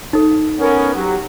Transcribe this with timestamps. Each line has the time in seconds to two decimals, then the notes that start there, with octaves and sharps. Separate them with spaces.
0.13 D#4 A4
0.59 B3 C#4 A#4
0.93 F#3 F#4 G4